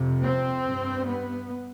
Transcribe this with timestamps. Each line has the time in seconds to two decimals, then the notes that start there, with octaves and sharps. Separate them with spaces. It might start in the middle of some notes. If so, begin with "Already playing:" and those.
Already playing: F2 C3
0.22 C4
0.64 G2
1.06 B3